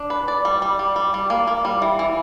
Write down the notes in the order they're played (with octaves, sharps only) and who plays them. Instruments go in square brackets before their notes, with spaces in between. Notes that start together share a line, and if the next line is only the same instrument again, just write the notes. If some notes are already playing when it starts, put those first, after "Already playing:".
Already playing: [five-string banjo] D4
B4
D5
G3
G3
G3
G3
G3
A#3
A#3
G3
E3
E3